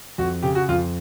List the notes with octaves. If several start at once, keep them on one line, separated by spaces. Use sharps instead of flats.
F2 F#4
C#3 G4
F#4
F2 F4